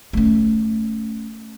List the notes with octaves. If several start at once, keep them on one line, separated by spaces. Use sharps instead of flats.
A3 C#4